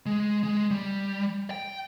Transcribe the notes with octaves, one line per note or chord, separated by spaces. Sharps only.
G#3
G#3
G3
G5